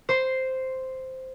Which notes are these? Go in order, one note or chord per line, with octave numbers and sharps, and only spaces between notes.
C5 C6